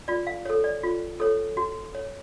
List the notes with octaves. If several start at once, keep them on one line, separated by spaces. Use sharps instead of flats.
F4 D5
F5
A4 C#5
D5
F4
A4 C#5
F#4
C#5